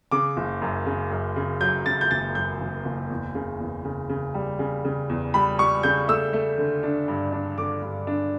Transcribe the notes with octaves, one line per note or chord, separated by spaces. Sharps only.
C#3 D6
F#1
F#2
C#3
F#2
C#3
F#3 G6
C#3 A6
G6
F#1 A6
F#2 G6
F#1
F#1
E2
C#3
E2
C#3
C#3
G3
C#3
C#3
E2
G3 B5
G3 C#6
C#3 G6
A3 E6
A3
D3
D4
G2
D4
D3 D6
G2
D4